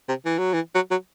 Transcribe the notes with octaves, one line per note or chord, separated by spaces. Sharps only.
C3
E3
F#3
E3
F#3
F#3